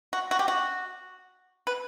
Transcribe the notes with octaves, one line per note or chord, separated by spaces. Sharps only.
F#4
F#4
G4
F#4
B4